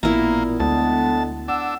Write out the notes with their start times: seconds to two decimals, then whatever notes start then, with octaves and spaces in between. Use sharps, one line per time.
0.03 A1 A#2 A#3 B3 E4 A#5
0.60 D2 D3 G#3 B3 A5
1.48 D4 F#5 E6